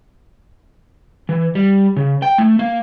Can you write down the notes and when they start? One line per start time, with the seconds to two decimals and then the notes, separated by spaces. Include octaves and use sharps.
1.29 E3
1.55 G3
1.97 C#3
2.22 G5
2.38 A3
2.59 A#3